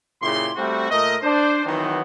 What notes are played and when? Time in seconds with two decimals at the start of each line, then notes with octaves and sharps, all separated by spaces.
0.22 A#2 C#3 E4 G4 C6
0.56 G3 A3 C4 F#4
0.90 A#2 A3 A#4 D#5
1.22 D4 C5
1.66 D#3 E3 F#3 B3 C4 D#4